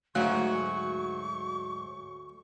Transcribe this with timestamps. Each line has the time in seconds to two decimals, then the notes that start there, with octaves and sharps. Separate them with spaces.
0.15 D2 G#2 F#3 A3 G#5 C#6